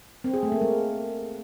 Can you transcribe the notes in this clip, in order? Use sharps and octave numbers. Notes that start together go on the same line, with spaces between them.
C4
G#4
A3
A#3
G#3